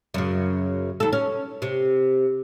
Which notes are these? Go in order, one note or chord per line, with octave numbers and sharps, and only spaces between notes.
F#2 C#3
D#2 A4
C#4
C3